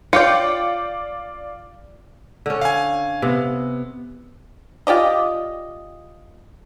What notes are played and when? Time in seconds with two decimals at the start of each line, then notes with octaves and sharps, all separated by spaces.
0.13 F4 C#5 D5 F5 G5 C#7
2.46 D3 C#4
2.61 F5 G#5
3.22 C3 B3
4.87 F4 G4 D5 D#5